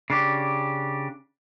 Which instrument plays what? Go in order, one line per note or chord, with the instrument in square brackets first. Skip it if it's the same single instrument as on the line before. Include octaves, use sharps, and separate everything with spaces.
[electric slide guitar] C#3 D4 G4